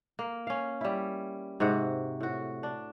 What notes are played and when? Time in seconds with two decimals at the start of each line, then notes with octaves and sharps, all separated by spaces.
0.19 A#3
0.47 C#4 F5
0.81 G3 E4
1.60 G#2 C3 F#4 F#5
2.21 A2 F#4
2.63 D4